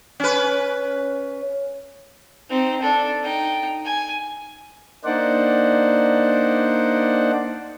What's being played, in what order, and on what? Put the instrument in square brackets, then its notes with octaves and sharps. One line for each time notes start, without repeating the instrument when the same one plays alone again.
[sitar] C#4 B4
[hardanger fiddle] C4 D#4
D4 A4
D#4 G5
G#5
[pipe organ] A#3 D4 D#4 C5 D5 F#5